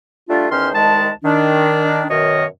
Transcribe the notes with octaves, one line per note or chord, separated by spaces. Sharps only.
G3 A3 D4 F4
E2 D#3 C#4 C5 C6 F6
C2 D#3 G#3 A5
D#3 D4
F#2 B2 D#3 C#5 D#5 D#6